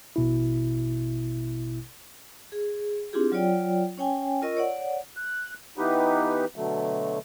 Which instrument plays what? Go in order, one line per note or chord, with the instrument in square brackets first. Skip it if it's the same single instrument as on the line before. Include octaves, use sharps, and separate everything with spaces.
[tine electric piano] A1 B2 E4
[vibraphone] G#4
C4 D4 E4 F4 G4 G#4
F#3 F4 C#5 D5 G5
C#4 C#5 G5 G#5
F4 A#4 D#5 C#6 E6
C#5 D5 F#5
[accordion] F#6
E3 B3 D#4 G4 B4
B2 D3 F#3 A3